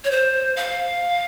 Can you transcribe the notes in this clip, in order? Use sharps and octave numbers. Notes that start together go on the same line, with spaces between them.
C#5
C5
F5